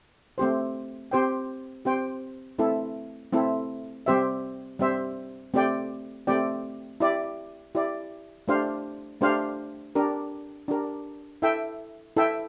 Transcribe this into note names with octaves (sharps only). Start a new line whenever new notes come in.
A3 C4 G4 C5
C4 G4 C5 G5
C4 G4 C5 G5
A3 C4 E4 A4
A3 C4 E4 A4
G3 C4 G4 C5 E5
G3 C4 G4 C5 E5
A3 C4 G4 D5 G5
A3 C4 G4 D5 G5
E4 G4 D5
E4 G4 D5
A3 D4 G4 C5 F5
A3 D4 G4 C5 F5
D4 G4 A#4
D4 G4 A#4
E4 A4 E5 G5
E4 A4 E5 G5